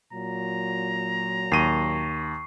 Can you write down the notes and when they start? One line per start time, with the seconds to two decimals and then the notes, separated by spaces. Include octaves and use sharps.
0.13 A#2 F#3 A#5
1.52 D#2 C#6 C7 D#7